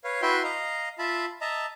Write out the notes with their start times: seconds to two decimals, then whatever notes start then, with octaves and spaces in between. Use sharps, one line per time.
0.04 B4 C#5 F5
0.22 E4 F#4 B4 E5 G5 C6
0.44 D#5 F5 A#5
0.99 F4 E5 A5 B5
1.41 D#5 E5 A5 A#5